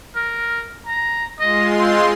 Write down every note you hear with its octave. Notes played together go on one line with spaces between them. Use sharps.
A#4
A#5
G#3 F4 D#5 C6
C4